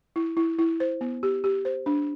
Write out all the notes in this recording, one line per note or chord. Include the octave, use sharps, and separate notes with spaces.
E4
E4
E4
C5
B3
G4
G4
C5
D4